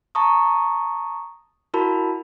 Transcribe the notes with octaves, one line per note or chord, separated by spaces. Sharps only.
A5 A#5 C#6 D#6
E4 F#4 A#4 A5 B5